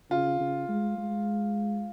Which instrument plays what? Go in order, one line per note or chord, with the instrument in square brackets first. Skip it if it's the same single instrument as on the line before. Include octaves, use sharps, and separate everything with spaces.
[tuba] C#3 [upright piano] F4
[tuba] C#3
G#3
G#3